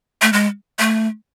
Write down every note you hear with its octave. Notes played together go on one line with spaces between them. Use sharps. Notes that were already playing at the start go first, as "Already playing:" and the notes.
A3
G#3
A3